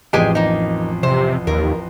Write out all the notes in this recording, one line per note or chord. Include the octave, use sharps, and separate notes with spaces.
A1 F2 G#3 G4 G#5
A#3 D#4
C3 C5
D#2 A#4